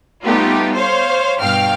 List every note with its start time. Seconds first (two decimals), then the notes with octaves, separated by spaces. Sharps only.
0.24 G3 A3 B3 D#4 F4 G4
0.74 C5 C#5 F5
1.40 G2 B2 F5 G5 F6